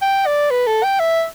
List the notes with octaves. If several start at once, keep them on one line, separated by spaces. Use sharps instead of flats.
G5
D5
B4
A4
G5
E5